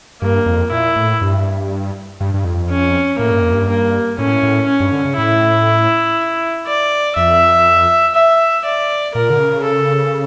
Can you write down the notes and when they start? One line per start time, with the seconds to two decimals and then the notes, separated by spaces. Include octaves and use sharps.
0.21 G2 A#3
0.46 F2
0.71 A#2 E4
0.96 A2
1.21 G2
2.21 G2
2.34 G2
2.45 F2
2.70 C#4
3.19 A2 A#3
3.31 G2
3.41 F2
3.53 G2
3.69 A#3
4.18 A2 C#4
4.43 A2
4.67 C#4
4.80 G2
4.92 D3
5.05 C#3
5.17 A2 E4
6.67 D5
7.16 F2 E5
8.15 E5
8.65 D5
9.14 A#2 A#4
9.30 D3
9.39 C#3
9.63 A4